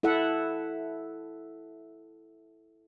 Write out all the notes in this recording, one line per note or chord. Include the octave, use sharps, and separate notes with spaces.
E4 A4 E5 F#5